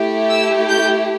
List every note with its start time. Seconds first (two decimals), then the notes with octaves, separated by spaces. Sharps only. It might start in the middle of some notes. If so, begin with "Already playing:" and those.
Already playing: A3 E4 G4
0.30 E6
0.69 G6